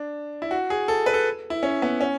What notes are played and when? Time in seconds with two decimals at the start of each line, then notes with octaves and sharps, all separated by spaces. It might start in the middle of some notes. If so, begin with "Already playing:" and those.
Already playing: D4
0.42 E4
0.51 F#4
0.70 G#4
0.88 A4
1.06 B4
1.14 A4
1.50 E4
1.63 C#4
1.82 B3
2.01 C#4